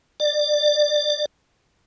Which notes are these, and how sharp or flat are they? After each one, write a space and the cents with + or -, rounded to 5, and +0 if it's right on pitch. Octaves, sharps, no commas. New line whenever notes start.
D5 +20